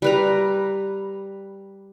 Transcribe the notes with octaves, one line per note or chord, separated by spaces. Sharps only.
G3 B4 A#5